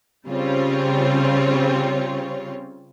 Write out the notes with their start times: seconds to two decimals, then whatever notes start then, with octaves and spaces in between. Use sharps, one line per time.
0.26 C#3 G3 C4 F4 C#5